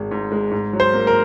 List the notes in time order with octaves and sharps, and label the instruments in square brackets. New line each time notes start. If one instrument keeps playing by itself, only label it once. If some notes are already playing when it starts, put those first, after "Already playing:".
Already playing: [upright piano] G#1 G#3
G#2
G#3
G#2
F#3
[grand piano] C5
[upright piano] A#3
[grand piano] A#4